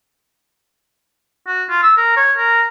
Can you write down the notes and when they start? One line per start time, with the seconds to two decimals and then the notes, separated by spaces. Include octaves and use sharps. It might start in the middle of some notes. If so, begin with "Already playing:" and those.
1.47 F#4
1.70 F4
1.83 E6
1.97 A#4
2.17 C#5
2.38 A#4